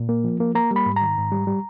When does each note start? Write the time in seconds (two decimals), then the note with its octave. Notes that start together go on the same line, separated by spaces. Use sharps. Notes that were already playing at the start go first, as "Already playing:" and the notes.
Already playing: A#2
0.09 A#3
0.24 F3
0.40 A#3
0.55 A#3 A#5
0.71 G3
0.76 B5
0.86 G#2
0.96 A#5
1.02 D#3
1.17 G#2
1.32 G3
1.47 G3